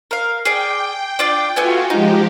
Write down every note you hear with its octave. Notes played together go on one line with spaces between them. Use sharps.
A#4 F5
G#4 D5 G5
D4 F4 D5
A3 B3 F4 F#4 G#5
F3 G#3 D#4 G4